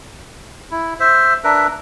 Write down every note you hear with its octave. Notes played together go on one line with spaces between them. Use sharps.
E4
C5 E5
D4 A#4 B4 E5